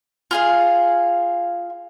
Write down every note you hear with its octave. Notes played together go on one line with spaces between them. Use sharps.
F4 G#4 F5